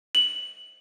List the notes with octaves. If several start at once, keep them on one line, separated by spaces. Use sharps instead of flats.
F#7